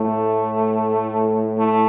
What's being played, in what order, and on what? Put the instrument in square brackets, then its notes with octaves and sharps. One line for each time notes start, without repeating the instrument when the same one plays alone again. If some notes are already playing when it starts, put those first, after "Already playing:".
Already playing: [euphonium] A2 [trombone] A3
[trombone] A3